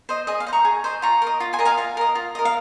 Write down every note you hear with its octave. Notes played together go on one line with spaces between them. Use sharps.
C5 D#5
G#4 D#5
F5
C5 D#5
A#5 C#6
G#4
C5 D#5
F4 A#5 C#6
A#4 D#5
F4
G#5 C6
A#4 D#5
F5 G#5
F4 F5
A#4 D#5
F4
A#4 D#5
F5